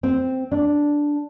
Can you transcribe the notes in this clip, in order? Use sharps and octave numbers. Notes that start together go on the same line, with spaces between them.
C4
D4